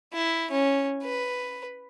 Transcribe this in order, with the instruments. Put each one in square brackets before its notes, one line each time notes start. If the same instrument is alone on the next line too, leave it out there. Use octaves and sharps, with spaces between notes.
[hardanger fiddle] E4
C#4
B4